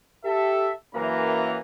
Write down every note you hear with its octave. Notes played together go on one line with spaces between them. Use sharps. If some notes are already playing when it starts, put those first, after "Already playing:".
G4 A4 E5
F#2 E3 A#3 A#5